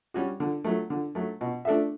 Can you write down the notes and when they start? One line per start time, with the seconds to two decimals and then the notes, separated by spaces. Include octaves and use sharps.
0.14 G3 C#4 F#4
0.40 D3
0.64 F#3 A3
0.90 D3
1.15 F#3 A3
1.41 B2
1.65 A3 D4 A4 E5